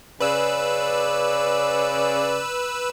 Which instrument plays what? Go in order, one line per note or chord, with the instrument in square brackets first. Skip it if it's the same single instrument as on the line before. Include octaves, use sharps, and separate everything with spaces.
[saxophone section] C#3 D5 [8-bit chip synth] B4 E6